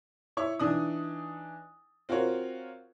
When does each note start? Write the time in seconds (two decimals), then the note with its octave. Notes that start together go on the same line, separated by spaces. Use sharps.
0.37 E4 C#5 C#6
0.59 E3 D4 D#4 D#6
2.09 C4 F4 F#4 A#4 C#5